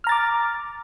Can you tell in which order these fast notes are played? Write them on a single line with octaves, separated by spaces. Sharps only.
F6 A#5 A6 D6